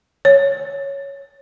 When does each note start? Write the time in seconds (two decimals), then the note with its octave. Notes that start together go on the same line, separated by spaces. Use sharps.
0.25 C#5